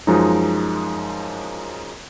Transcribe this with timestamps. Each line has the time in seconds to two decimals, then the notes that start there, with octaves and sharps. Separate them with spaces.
0.07 F#2 F3 G#3 D#4